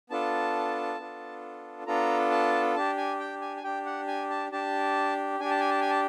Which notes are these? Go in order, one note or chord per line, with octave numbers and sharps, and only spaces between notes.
B3 D4 F4 A4 A5
B3 D4 F4 A4
B3 D4 F4 A4 A#5
A5
D4 G4 A5
G#5
G5
G#5
G#5
D4 G4 G5
F#5
G#5
A5
D4 G4 A5
D4 G4 G#5
A5
G#5
A5
G#5
A5